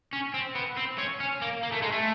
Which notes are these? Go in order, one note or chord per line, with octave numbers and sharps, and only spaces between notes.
C#4
C4
B3
C4
C#4
C#4
A#3
A#3
A3
G#3
A3